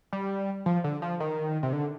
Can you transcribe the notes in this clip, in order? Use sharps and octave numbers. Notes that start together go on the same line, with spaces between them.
G3
F3
D3
F3
D#3
C3
D3